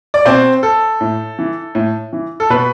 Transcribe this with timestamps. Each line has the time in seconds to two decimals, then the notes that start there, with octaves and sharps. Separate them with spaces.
0.14 D5
0.25 B2 C4 C5
0.63 A4
1.01 A2
1.39 E3
1.75 A2
2.13 E3
2.40 A4
2.50 B2 B4